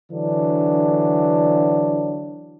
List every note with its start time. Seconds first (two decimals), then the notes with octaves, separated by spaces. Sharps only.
0.12 D3 E3 F#3 D4